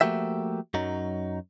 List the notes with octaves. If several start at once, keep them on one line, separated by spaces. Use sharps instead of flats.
F3 A3 A#3 F#4 G4 E5
F#2 F#3 D#4